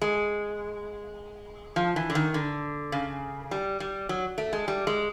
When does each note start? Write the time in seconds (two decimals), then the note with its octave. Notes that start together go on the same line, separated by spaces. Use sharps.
0.02 G#3
1.76 F3
1.96 E3
2.10 D3
2.15 D#3
2.34 D3
2.92 C#3
3.51 G3
3.80 G3
4.09 F#3
4.38 A3
4.53 G#3
4.68 G3
4.87 G#3